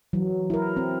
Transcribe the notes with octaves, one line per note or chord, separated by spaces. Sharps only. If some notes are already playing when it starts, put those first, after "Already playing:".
E3 F#3
E4 A#4
C4